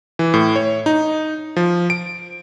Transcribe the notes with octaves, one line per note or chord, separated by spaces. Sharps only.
E3
A2
C#5
D#4
F3
D7